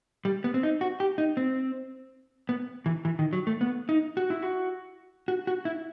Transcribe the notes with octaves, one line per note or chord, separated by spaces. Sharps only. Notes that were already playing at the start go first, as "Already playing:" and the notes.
G3
B3
C4
D#4
F#4
G4
D#4
C4
B3
E3
E3
D#3
F#3
A3
B3
D#4
F#4
E4
F#4
F#4
F#4
E4